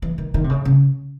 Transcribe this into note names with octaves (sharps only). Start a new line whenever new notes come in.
E3
D#3
D#3
C3
C#3
C#3